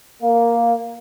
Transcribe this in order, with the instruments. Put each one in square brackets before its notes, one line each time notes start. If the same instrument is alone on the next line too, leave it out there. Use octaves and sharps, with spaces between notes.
[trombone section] A#3